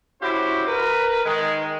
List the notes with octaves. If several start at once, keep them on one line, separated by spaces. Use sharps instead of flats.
C#4 E4 F#4 G4 C5 E5
A#4 B4
D#3 G#3